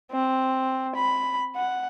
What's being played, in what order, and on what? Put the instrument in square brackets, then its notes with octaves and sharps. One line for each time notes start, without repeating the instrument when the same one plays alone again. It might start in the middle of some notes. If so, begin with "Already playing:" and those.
[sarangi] C4
B5
F#5